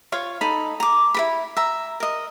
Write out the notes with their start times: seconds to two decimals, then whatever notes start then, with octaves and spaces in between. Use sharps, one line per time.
0.12 F4 C#5 F5 C#6
0.41 D#4 A4 B5
0.80 A#5 D6
1.14 E4 A#4 B5
1.57 E5 A#5
2.00 A#4 D#5